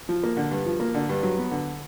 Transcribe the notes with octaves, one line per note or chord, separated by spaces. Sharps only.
F3
A#3
D3
G2
F3
A#3
D3
G2
F#3
B3
D3